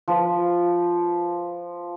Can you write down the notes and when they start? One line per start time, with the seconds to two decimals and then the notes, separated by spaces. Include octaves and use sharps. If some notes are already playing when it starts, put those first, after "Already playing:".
0.08 F3 B4